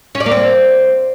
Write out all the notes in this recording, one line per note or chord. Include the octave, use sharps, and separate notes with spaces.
C#4
D5
A#3
C4